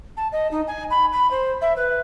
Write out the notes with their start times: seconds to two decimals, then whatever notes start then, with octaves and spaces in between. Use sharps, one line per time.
0.17 A5
0.32 D#5
0.51 D#4
0.67 G#5
0.90 B5
1.12 B5
1.31 C5
1.61 E5
1.76 B4